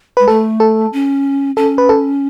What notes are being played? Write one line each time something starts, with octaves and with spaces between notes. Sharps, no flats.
G#3 B4
A3 A4
A4
C#4
C#4 A4
B4
A4